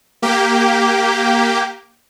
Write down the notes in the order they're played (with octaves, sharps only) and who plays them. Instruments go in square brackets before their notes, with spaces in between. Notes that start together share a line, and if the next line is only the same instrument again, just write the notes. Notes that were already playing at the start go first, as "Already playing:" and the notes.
[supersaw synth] A#3 G4